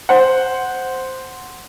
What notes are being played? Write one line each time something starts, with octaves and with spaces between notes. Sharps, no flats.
C5 F#5